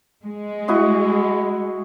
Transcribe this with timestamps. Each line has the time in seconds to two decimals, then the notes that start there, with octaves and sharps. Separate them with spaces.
0.24 G#3
0.68 E4 F#4 D#5